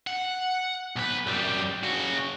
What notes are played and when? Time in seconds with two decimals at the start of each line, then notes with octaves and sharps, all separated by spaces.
0.07 F#5
0.96 B1 B4
1.27 F#2 G3
1.84 C#3 F#4